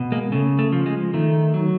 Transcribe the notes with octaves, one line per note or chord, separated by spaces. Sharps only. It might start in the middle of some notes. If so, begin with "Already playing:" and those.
Already playing: B2
G#3 A#3
C#3 A3
A3
F3
G#3
D#3 A3
F#3